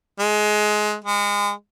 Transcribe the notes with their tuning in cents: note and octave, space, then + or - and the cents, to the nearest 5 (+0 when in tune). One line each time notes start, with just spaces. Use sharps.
G#3 +20
G#3 -30